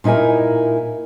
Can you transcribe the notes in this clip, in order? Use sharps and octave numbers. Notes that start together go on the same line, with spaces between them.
A#2 D#4 E4 A#4 G#5